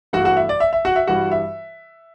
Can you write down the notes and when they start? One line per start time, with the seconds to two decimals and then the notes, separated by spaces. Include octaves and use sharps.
0.13 G2 E3 A3 F#4 F#5
0.25 F#4 F#5
0.37 E5
0.49 D5
0.60 E5
0.73 E5
0.85 F#4 F#5
0.96 E5
1.07 G2 E3 G3 F#4 F#5
1.31 E5